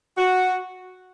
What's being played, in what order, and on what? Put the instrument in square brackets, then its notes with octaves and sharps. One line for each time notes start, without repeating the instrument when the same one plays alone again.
[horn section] F#4